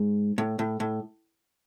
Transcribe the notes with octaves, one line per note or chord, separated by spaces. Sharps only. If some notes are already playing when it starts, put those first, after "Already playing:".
Already playing: G#2
A2
A2
A2